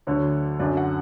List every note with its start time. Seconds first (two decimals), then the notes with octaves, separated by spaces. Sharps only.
0.07 D2 D3 F#3 C#5
0.59 F#2 D3 F#3 D5
0.77 F#5